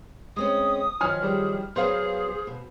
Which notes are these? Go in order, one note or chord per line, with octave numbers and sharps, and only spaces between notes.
G#3 C4 C#4 D#6
D#3 F3 F#3 G#5 F6
G3 G#4
F#3 B3 G#4 C5 F5
B2